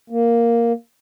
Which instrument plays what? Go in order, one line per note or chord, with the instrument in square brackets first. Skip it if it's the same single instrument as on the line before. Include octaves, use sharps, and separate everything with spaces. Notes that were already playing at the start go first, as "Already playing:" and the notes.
[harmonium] A#3